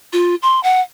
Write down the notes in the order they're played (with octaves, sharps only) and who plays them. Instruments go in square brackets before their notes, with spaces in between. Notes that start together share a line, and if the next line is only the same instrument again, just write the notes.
[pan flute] F4
C6
F#5